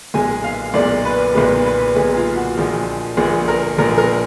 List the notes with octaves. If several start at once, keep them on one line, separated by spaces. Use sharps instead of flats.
B1 A#2 G#3 G#5
F5
B1 A#2 G#3 D5
B4
B1 A#2 G#3 B4
B4
B1 A#2 G#3 G#4
F4
F#4
A#1 A#2 F3 G#3
A#1 A#2 F3 G#3 G#4
A#4
A#1 A#2 F3 G#3 A#4
A#4